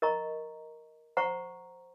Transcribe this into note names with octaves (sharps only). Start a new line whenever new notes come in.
A#4 D#5 A#5 C#6
C5 F#5 A#5 C#6